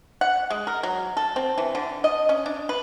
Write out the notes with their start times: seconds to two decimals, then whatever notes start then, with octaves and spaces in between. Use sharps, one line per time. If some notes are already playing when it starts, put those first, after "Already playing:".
0.21 F#5
0.50 G#3
0.67 A#4
0.83 F#3
1.17 A4
1.36 C4
1.58 E3
1.75 D3
2.04 D#5
2.29 C#4
2.46 D4
2.69 B4